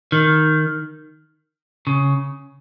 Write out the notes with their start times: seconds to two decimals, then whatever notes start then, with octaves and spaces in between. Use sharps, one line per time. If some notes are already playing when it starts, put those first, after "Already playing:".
0.12 D#3
1.87 C#3